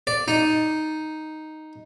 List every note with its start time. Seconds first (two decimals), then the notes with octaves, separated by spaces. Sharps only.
0.07 D5
0.28 D#4